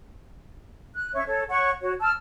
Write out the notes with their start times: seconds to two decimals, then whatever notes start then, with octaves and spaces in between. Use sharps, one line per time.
0.95 F#6
1.14 C#4 C#5 E5 C#6
1.27 A4 C#5
1.49 C#5 F#5 C#6
1.81 F#4 C#5
2.01 A5 E6 F6